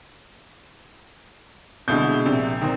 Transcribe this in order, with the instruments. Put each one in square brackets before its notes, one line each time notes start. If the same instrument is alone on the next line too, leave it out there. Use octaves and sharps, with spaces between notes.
[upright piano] C2 G6 [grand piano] B2 D3 G#3
[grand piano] A#1 [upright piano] C3
[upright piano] D#3 C4